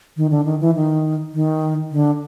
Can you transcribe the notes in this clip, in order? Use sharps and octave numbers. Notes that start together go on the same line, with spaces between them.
D#3
D3
D#3
E3
D#3
D#3
D3